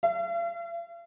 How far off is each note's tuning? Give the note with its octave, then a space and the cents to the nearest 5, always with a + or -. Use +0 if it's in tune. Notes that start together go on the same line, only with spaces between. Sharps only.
F5 -45